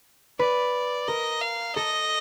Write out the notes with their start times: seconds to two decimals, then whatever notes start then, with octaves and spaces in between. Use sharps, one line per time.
0.39 B4 D5
1.08 A#4 D#5
1.41 F5
1.75 A4 D#5